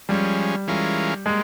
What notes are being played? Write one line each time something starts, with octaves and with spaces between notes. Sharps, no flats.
F3 G3 G#3 C#4
E3 G#3 C#4 F4 A#4
G3 G#3 A#3